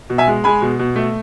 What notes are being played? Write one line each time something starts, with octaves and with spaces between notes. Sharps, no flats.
B2
E5 G#5
G#3
G#3 G#5 B5
B2
B2
A3